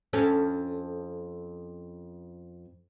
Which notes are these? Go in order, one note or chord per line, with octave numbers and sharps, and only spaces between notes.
F2 C#4 A4